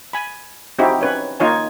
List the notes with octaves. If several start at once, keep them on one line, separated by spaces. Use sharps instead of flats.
G#5 B5
C4 D#4 E4 F#4 G4
C#4 B4 C#5
A#3 D#4 F4 C#5 G#5